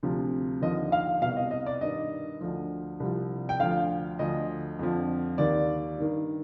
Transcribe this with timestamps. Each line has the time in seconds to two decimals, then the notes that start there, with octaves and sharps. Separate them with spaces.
0.03 D2 C3 F3
0.62 D#2 D3 F3 D#5
0.92 F5
1.22 B2 F5
1.25 C2
1.37 D#5
1.51 D#5
1.66 D5
1.81 G2 D#3 D#5
2.41 D2 D3 F3
3.00 C2 C3 F3
3.49 G5
3.60 D2 D3 F3 F5
4.19 D2 D3 F3 D#5
4.79 F2 D3 F3
5.38 D#2 D#3 D5
5.98 G2 D#3